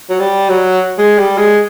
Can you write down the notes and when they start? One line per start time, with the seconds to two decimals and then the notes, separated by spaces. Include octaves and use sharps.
0.10 F#3
0.20 G3
0.49 F#3
0.99 G#3
1.19 G3
1.38 G#3